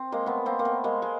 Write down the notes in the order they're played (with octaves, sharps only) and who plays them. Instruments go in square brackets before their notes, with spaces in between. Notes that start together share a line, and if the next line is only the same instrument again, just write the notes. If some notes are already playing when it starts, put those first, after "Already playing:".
Already playing: [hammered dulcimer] C4
G#3 A#3
A3 B3
A#3 C4
A#3
A3 B3
G#3 A#3
G#3